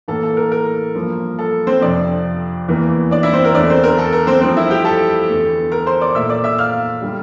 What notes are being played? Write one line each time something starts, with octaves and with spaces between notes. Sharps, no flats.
A2 E3 A#3 A4
A4
A#4
A#4
G2 F3 A#3
A4
C4 C5
F2 C3 F3 D4 D5
E2 E3 A#3
D4 D5
E4 E5
C4 C5
A#4
E2 D3 A3 D4 D5
C4 C5
A#4
A4
A#4
C4 C5
G2 F3 A3 C4 C5
E4 E5
G4 G5
A4 A5
E2 D3 A3
A#4 A#5
C5 C6
D5 D6
A#2 A3 E5 E6
D5 D6
E5 E6
F5 F6
D3 G3